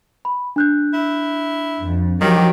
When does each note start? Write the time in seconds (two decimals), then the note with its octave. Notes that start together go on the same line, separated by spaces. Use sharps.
0.25 B5
0.56 D4 F#6 G6
0.94 E4
1.82 F2
2.21 D#3 F3 F#3 G4